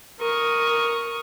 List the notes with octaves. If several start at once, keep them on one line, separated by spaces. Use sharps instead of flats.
A#4 C#6 D#6